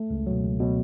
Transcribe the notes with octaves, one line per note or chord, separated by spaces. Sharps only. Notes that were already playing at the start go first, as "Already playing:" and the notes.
Already playing: A3
C#2
B2 F#3
C#2
B2 F#3